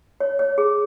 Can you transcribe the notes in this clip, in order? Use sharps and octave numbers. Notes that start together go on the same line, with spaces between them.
C#5
C#5
G#4